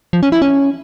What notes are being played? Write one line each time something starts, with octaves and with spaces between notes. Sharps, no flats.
F3
C#4
E4
C#4